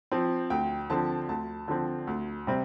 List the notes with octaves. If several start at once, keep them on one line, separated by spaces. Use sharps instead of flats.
F3 C4
D2 G5
D3 F3 C4 A5
D2 A5
D3 F3 C4
D2
C3 G3 C4